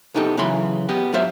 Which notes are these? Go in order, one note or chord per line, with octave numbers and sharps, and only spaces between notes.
C2 B3 D#4 G4 A4
C#3 E3 F#3 B5 C6
B3 G4 D#5
G2 F#3 F4 C5 E5 F5